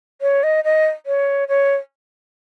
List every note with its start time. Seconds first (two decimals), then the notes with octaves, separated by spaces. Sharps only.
0.22 C#5
0.43 D#5
0.64 D#5
1.06 C#5
1.48 C#5